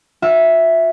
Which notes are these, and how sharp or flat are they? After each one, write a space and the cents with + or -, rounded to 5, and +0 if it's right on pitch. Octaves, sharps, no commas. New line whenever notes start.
F#4 -45 E5 +0